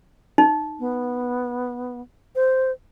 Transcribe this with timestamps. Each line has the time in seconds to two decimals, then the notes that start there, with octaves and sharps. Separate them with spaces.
0.38 D#4
0.80 B3
2.36 C5